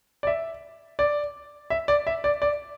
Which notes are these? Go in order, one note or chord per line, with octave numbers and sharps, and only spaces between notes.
D5
E5
D5
E5
D5
E5
D5
D5